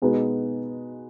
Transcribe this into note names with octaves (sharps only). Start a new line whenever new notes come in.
B2 G#3 B3 D#4